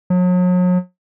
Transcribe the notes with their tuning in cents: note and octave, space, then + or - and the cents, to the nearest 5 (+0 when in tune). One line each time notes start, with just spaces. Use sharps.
F#3 -40